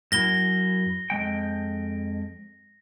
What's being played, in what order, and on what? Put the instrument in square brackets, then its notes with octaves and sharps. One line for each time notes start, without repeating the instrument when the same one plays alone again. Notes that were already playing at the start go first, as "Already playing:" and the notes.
[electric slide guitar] F#2 E4 [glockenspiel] A#6 G7
[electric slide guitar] F2 G#3 G5